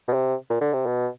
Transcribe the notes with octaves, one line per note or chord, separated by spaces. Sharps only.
B2
C3
A#2
D3
C3
B2